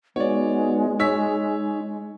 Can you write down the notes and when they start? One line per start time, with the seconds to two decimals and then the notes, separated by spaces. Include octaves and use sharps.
0.16 G#3 B3 D#4 F#4 C#5 D5
0.99 D#4 C#5 E6 B6